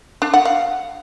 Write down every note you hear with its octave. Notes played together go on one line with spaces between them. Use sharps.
D4
F#5
F5